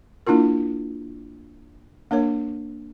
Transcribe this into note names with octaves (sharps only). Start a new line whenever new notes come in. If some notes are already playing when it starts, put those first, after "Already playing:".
A#3 D4 E4 F4 A#4
A#3 D4 A#4 C#5